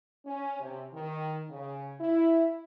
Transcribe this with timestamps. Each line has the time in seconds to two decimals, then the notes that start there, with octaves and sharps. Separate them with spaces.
0.24 C#4
0.59 C3
0.91 D#3
1.50 C#3
2.00 E4